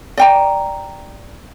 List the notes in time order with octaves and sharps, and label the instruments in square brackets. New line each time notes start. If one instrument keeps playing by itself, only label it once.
[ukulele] D5 G5 A#5